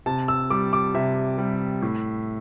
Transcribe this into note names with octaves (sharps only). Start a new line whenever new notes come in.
C3 A5
E6
G3 D6
D6
C3 E5
G3
A2